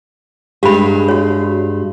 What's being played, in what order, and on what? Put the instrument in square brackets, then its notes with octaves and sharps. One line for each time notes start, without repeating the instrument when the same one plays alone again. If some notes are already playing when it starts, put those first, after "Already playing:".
[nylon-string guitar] G2 G#3 [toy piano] G4 B5
[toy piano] F#4 C#5